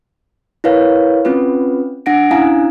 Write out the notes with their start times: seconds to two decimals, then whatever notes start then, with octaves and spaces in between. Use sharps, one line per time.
0.64 E4 A#4 B4 C#5 F5
1.25 C4 C#4 F4 B4
2.06 D4 F#5 A#6 D7
2.31 C#4 D4 E4 F5 G#5 A#5